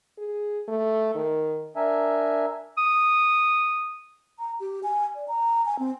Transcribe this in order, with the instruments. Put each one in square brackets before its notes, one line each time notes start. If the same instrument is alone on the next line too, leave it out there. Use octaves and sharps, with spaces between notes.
[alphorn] G#4
A3
D#3
[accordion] D4 A#4 E5 G#5
[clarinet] D#6
[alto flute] A#5
G4
G#5
D5
A#5
G#5
C4